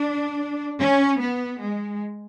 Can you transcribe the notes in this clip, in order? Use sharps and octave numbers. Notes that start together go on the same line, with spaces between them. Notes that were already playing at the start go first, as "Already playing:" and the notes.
Already playing: D4
C#4
B3
G#3